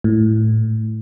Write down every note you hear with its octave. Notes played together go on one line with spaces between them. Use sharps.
A2